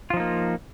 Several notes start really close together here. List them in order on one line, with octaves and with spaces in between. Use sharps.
F4 F3 D#4 A#3